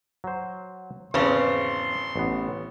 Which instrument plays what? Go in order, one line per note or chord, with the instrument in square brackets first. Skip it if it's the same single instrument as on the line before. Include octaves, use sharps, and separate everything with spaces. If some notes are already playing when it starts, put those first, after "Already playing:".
[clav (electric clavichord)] F#3 C5
[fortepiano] G#1 C#3 [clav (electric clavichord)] E2 [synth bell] B4 C5 [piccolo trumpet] C6
[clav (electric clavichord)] A1 B3